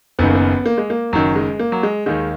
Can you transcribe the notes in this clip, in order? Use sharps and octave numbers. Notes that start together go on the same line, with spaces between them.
F#1 F#2 D#3 B3
A#3
B3
A#3
G#3
A#3
F#1 F#2 D#3 F#3
G#3
A#3
F#3
G#3
D#2 D#3 G#3